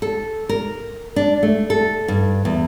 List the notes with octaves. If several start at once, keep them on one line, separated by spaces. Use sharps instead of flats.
A4
A#4
D4
A3
A4
G2
E2